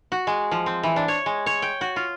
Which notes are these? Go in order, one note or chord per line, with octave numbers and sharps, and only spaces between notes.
F#4
G#3
F3
C4
E3
D4
C#5
G#3
C#5
G5
F#4
F4